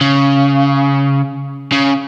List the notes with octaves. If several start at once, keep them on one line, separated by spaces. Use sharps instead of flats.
C#3
C#3